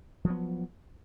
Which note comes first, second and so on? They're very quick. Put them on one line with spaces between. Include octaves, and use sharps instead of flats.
F3 F#3 B3